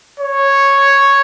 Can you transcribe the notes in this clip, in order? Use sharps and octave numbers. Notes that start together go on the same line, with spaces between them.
C#5